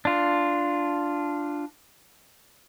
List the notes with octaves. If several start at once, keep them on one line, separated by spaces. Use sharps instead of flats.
D4 F4